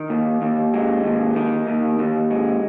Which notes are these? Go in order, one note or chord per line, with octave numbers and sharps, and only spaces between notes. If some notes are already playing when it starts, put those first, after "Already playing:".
Already playing: D#3
D#2
D#2
G#3
D#2
D#3
D#2
D#2
G#3